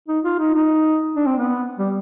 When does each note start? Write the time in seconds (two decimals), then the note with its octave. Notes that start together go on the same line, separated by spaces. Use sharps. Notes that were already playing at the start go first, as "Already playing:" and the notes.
0.08 D#4
0.24 F4
0.39 D#4
0.55 D#4
1.16 D4
1.26 C4
1.38 B3
1.79 G3